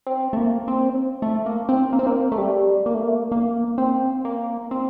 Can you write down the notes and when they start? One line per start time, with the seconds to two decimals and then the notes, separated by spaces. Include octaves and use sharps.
0.07 C4
0.33 A3
0.37 A#3
0.68 C4
1.22 A3
1.46 A#3
1.69 C4
1.93 A#3
1.99 C4
2.07 A#3
2.32 A3
2.38 G3
2.86 A#3
2.94 A3
3.03 A#3
3.32 A#3
3.78 C4
4.25 A#3
4.71 C4